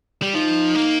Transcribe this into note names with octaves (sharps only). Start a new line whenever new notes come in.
G3
F3 D#4
A#3